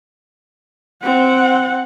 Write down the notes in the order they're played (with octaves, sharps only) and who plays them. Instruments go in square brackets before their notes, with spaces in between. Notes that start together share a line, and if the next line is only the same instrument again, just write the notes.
[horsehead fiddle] C4 F#5